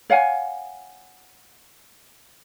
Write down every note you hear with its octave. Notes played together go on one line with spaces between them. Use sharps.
C#5 F5 F#5 G#5